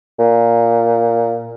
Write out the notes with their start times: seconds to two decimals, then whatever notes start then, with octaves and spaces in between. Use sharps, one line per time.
0.20 A#2